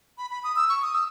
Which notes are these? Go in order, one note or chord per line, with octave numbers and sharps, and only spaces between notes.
B5
B5
D#6
E6
C#6
D#6
E6